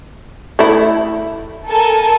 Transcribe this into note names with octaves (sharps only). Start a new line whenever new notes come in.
A3 E4
A4 A#4 G#5